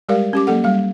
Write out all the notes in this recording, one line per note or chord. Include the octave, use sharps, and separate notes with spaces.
G3 G#3 G4 A#4 D5 F5
C#4 G4 D6
F#3 A#3 A4 F#5
G3 F5